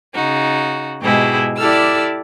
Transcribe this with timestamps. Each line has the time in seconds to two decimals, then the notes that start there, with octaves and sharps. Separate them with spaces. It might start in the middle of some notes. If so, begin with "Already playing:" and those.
0.15 C#3 D#4 F#4
1.02 G#2 B2 G#3 E4 G4 G#4
1.58 E4 G4 A4 D5 E6 F6